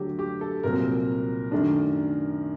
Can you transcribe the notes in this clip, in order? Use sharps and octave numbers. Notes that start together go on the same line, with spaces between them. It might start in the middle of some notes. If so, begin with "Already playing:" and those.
Already playing: D2 D3 F#3 G4
G4
A4
C2 A#2 F#3 C4 A#4
F#2 D#3 A3 D4